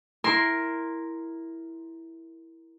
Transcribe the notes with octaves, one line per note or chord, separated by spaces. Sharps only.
E4 A#4 C6